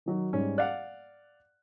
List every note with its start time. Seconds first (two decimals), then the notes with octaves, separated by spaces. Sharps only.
0.06 D#3 F#3 D#4
0.33 G#2 G3 C#4
0.58 D5 F5 F#5 F#6